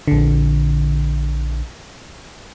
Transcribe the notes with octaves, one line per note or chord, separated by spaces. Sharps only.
A#1 D3